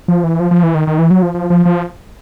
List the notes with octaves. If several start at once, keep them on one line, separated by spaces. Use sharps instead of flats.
F3
E3
F3
F3
E3
D#3
D#3
E3
F#3
F3
F3
F3
F3